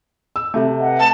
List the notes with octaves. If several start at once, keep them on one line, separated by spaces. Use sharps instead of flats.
E6
C3 A3
B4 D#5 F#5
A5